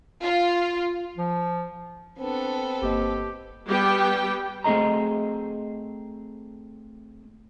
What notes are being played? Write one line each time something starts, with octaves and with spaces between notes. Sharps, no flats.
F4
F3
B3 C4 D4 A4
G1 A#3 G4 D#5
G3 B3 G4 G5
A3 C4 G#4 D#5 A#5